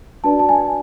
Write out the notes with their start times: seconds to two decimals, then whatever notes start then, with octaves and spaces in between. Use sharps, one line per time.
0.24 D4 F#4 B4 D5 A5
0.39 A5
0.49 G#5